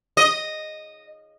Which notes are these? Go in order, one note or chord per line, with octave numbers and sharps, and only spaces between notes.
D#5